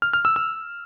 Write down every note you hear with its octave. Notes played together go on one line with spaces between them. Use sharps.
F6
F6
E6
E6